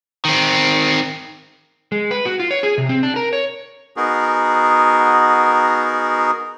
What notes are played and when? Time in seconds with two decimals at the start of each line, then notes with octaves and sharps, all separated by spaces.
0.25 D#3 C4
1.92 G#3
2.11 B4
2.25 F#4
2.40 F4
2.51 C#5
2.63 G#4
2.78 C3
2.89 C4
3.03 D4
3.16 A#4
3.33 C#5
3.97 B3 D#4 F#4 G#4 A#4